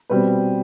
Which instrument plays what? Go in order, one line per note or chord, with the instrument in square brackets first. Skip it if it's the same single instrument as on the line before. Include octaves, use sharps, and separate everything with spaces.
[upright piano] B2 G3 C4 B4